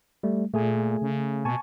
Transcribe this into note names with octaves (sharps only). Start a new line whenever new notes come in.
G3 A3
A#2 A3 G#4 G#5
C#3
B2 G#5 A5 C#6